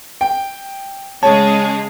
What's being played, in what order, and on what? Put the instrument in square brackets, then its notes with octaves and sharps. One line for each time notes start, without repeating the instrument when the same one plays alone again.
[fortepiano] G5
[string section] C#3 G#3 G#4 [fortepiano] C#5 [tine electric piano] A5